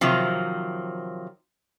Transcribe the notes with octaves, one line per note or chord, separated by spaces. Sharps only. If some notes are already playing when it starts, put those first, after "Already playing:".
C3 D#3 F3 F#3